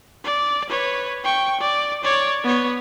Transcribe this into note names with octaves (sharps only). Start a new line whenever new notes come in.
D5
B4 C#5
G5 C#6
D5
C#5 D5
B3 C#5